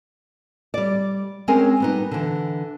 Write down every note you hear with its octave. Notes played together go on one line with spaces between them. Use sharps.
G3 D5
G#3 C4 C#4 G#4 A#4 G#5
G3 B3 D#4
D3 E3